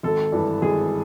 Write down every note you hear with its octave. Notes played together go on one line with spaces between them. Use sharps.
G#1 A4
G2 E3
G#1 G#4